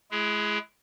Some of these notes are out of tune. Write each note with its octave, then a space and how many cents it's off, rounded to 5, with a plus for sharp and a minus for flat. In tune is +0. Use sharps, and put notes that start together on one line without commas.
G#3 +35 E4 +20 G#4 +0